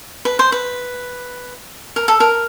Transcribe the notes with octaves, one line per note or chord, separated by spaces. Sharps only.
B4
C5
B4
A#4
A4
A#4